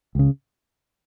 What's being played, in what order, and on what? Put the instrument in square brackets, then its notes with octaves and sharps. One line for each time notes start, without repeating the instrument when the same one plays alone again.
[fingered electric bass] C#2 C#3